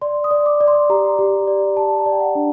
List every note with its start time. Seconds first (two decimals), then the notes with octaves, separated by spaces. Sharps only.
0.02 D5 C6
0.24 D#6
0.31 D5
0.46 D6
0.61 D5
0.68 C6
0.90 G4 A#5
1.19 G4
1.47 D5
1.76 G4 A5
1.98 A#5
2.06 D5
2.12 G5
2.20 F#5
2.35 D4